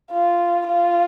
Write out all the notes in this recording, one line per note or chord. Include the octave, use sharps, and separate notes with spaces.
F4
F4